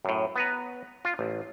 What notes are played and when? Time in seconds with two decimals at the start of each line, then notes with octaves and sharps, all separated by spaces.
0.05 F#2 A2
0.36 B3 B4 A#5
1.05 F4
1.19 A1